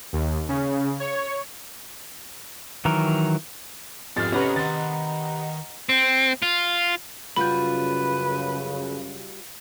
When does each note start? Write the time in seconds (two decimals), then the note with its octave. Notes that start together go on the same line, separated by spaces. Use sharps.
0.13 D#2
0.49 C#3
1.00 C#5
2.85 D#3 E3 F#3 A#4
4.17 F2 G#2 G4 A4 F6 A6 C7
4.32 C3 C#4 B4 D#5 F#5 A#5
4.56 D#3 C6 A6
5.89 C4
6.42 F4
7.36 F#2 C#3 G3 F4 F#4 B4 B5 G6